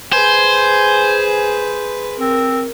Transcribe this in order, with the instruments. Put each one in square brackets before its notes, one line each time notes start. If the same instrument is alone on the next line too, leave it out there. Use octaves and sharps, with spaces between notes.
[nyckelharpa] G#4 B4 [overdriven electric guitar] C5 [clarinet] G#5
[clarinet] C4 [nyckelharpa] A#4